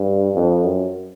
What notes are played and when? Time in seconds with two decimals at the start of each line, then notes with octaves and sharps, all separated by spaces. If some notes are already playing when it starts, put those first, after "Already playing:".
Already playing: G2
0.35 F2
0.64 F#2